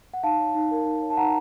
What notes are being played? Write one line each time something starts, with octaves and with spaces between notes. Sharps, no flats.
F#5
D#4 F5 A5
C#5
D#4
A#4
D#4
C#5
A5
D#4 F#5 A#5